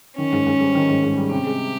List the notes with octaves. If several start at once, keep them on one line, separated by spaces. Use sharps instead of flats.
D#3 C#4
G#2
G#2
G3
D#3
G#2
G#2
G3
C3 G4
G#3